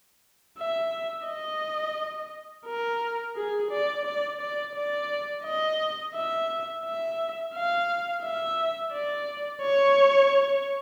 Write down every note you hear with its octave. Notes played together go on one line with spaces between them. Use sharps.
E5
D#5
A#4
G#4
D5
D5
D5
D5
D#5
E5
E5
F5
E5
D5
C#5